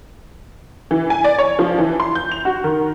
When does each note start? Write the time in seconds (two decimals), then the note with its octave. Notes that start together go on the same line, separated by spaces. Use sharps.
0.91 E3
1.10 G#5
1.24 D5
1.39 C#5
1.59 F3
1.79 E3
2.00 C6
2.15 G6
2.32 F7
2.45 F#4
2.64 D#3